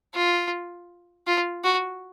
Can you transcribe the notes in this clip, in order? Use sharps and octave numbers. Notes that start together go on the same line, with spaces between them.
F4
F4
F#4